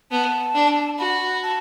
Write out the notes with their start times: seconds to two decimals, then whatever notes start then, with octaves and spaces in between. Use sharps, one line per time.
0.11 B3 A5
0.55 D4
0.99 F#4 B5
1.43 A5